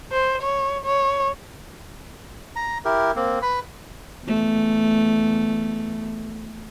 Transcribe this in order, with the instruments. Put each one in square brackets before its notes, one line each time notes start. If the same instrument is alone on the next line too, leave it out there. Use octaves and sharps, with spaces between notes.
[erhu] C5
C#5
C#5
[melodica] A#5
E4 G4 A#4
A#3 C4
B4 B5
[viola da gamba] E2 A3